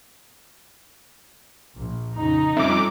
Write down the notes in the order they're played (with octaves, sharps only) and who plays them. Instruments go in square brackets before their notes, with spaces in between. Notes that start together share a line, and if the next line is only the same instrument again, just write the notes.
[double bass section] A#1
[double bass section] F2 C#3 [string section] D#4
[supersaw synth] F2 D6 [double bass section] G3 C#4 [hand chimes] E5